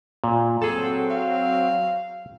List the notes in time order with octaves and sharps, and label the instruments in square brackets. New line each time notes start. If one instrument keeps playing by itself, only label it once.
[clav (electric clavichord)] A#2
[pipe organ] F#3 C4 [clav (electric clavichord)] G#4 A5 [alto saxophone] A4
[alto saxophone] F5